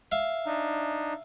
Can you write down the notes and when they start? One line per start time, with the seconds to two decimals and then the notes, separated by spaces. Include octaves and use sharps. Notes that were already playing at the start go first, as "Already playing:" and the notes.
0.12 E5 F5
0.46 D4 D#4